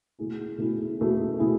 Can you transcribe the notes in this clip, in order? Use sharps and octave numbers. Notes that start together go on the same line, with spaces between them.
B2 A3 E4 G#4
B2 A3 E4 G#4
B2 A3 E4 G#4
B2 A3 E4 G#4